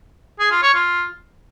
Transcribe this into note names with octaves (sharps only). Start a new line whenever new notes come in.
G#4
F4
C#5
F4